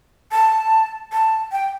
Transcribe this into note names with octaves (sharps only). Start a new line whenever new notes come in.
A5
A5
G5